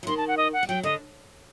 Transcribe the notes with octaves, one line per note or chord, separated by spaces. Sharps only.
F#3
D#3 C6
A5
F#5
D#5
F#5
G3
F#3 G5
D3 D#5